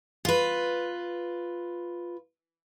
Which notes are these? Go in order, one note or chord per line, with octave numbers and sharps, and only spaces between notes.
F4 B4